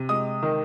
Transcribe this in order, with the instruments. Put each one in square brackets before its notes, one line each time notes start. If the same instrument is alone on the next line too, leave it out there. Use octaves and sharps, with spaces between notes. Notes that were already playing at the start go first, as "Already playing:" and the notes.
Already playing: [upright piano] C3
G#3 D#6
D#3